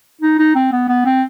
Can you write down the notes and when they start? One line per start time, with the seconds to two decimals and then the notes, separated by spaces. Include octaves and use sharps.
0.22 D#4
0.39 D#4
0.55 C4
0.72 B3
0.89 B3
1.05 C4